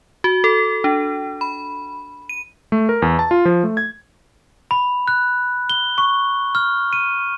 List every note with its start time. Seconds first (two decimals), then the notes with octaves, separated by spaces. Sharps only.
0.24 F#4
0.44 A4
0.84 D4
1.41 B5
2.29 D#7
2.72 A3
2.89 A#4
3.02 E2
3.19 A5
3.31 F4
3.45 F3
3.64 A3
3.77 G#6
4.71 B5
5.08 F#6
5.69 G7
5.98 C#6
6.55 F6
6.93 D#7